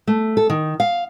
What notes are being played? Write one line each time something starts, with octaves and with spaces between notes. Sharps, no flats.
A3
A4
D#3
F5